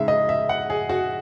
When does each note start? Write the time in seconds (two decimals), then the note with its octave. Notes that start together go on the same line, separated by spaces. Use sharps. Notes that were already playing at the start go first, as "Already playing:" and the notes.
Already playing: C#3 G#3 D#4 E5
0.08 D#5
0.29 E5
0.49 F#5
0.70 G#4
0.89 F#4